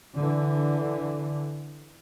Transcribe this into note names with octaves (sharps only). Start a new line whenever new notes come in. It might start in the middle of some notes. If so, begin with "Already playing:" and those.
D3 E3